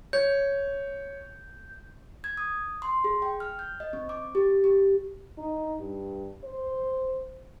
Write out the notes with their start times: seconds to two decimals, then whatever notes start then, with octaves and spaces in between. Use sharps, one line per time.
0.13 C#5 G6
2.24 G#6
2.37 D#6
2.82 C6
3.04 G#4
3.22 G5
3.40 F6
3.59 G6
3.80 D#5
3.93 C4
4.09 D6
4.35 G4
4.64 G4
5.38 D#4
5.80 G2
6.44 C5